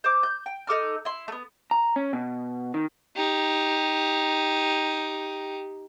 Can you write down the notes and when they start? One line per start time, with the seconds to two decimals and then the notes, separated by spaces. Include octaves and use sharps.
0.04 C5 D6
0.23 G6
0.46 G5
0.67 D#4 A4 D6 F6
1.05 E4 C6
1.28 A3 B3
1.71 A#5
1.96 C#4
2.13 B2
2.74 D#3
3.16 D#4 G4